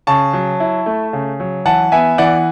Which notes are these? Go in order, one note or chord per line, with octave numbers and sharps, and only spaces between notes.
C#3 A5 C#6
F#3
E4
A3
C#3
F#3
E3 F#5 A5
B3 E5 G#5
E3 D5 F#5